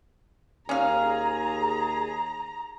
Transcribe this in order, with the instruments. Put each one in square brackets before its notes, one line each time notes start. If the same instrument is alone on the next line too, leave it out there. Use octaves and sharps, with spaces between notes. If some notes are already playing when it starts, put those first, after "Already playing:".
[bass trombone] D#2 [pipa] C#4 F5 [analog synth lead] G#4 [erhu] A#5